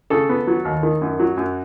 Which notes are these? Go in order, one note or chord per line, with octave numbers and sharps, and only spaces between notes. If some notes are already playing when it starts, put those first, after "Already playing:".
C#3 A4
B3
F#3
D#2
D#3
F#2
F#3
F#2